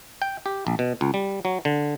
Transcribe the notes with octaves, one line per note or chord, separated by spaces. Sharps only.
G5
G4
A#1
B2
C#2
G3
F#3
D3